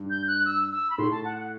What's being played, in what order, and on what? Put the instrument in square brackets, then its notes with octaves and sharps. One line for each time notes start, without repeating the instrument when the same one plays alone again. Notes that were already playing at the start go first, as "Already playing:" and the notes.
Already playing: [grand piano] G2
[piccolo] G6
F#6
E6
E6
B5
[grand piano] A2 [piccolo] C6
[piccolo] A5
F#5
F#5